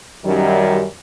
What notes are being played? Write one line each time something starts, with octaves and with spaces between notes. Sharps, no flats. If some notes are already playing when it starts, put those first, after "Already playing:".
F#2 D#3 G3